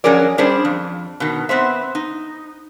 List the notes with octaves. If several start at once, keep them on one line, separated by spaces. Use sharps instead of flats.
F3 F#3 C#4 G#4 A#4 D5
G3 C#4 D4 G#4 C5 D5
F2
B2 D#3
B3 C4 C5 E5
D#4